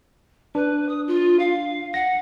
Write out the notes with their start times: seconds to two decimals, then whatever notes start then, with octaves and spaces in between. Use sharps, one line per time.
0.55 D4 B4
0.89 D#6
1.07 F4
1.39 F5
1.94 F#5 A#6